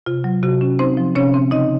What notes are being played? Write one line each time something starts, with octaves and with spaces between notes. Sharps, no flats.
C3 F4
F#3
C3 F#4
C#4
C4 D#4 C5
F3
C3 C#4 C#5
C4
C#3 D#4 D#5